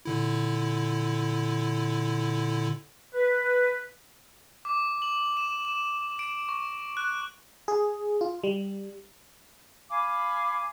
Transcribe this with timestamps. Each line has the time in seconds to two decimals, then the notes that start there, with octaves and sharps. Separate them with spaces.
0.05 A#2 D3 E4
3.14 B4
4.65 D6
5.02 F#7
5.37 E7
5.65 E7
6.19 D7
6.49 C#6
6.97 F#6
7.68 G#4
8.21 F4
8.44 G3
9.89 F5 G#5 B5 D6